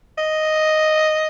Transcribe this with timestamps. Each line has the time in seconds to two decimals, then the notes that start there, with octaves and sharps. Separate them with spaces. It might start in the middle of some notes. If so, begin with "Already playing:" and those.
0.18 D#5